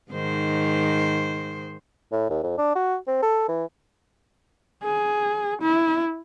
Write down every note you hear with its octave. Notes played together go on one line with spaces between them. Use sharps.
G#2 D#3 C5
A2
D#2
F2
D4
F#4
C4
A4
E3
G#4
E4